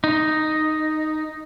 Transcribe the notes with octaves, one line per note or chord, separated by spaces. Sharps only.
D#4